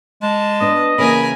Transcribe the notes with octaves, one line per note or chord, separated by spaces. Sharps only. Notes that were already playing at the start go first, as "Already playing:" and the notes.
G#3 A5
B3 D4 B4 D#5
C#3 E3 A#3 A#4 G#5 B5